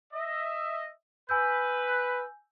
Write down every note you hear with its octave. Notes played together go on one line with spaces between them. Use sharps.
D#5 E5
B4 G#5 E6 G6